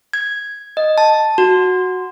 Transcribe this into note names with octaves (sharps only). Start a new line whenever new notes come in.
G#6
D#5
A5
F#4